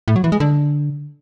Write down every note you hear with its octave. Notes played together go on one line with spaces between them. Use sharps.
A2
F#3
E3
G#3
D3